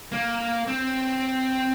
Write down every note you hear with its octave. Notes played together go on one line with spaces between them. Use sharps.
A#3
C4